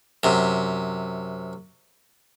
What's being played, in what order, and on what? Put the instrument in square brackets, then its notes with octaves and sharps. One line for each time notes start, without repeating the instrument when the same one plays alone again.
[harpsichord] F#2 C3